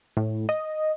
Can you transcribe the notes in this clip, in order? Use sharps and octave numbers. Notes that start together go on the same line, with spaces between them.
A2
D#5